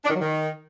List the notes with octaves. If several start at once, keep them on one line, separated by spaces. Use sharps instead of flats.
D4
D#3
F#3
D#3